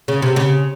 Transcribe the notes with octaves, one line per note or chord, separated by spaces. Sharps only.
C#3
C3
C#3